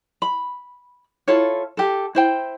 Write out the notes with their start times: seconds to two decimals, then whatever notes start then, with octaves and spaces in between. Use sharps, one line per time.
0.22 B5
1.28 E4 F4 A4 C#5
1.77 G4 A4
2.15 E4 C5 G5